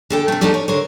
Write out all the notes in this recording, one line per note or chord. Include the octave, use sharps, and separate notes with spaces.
D3 A4 G5
C3 A3
F3 G3 A3 D4 D#4 G4
C#5
D3 A#4 C5 C#5